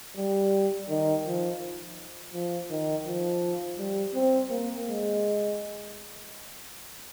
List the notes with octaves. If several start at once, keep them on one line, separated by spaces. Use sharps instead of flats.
G3
D#3
F3
F3
D#3
F3
G3
C4
A#3
G#3